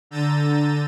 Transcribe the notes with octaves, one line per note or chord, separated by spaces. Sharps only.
D3 A#5 E6 G6 A6 D#7